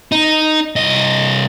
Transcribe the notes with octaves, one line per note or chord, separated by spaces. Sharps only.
D#4
C2 D#5